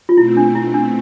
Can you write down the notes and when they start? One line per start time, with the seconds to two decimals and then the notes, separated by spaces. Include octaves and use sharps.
0.09 F4
0.17 B2 A3 C4 E4
0.37 D4
0.55 E4
0.74 D4